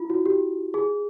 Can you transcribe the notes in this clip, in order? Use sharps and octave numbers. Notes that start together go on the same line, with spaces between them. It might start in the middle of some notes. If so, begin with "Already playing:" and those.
Already playing: E4 F4
F#4
G4
G#4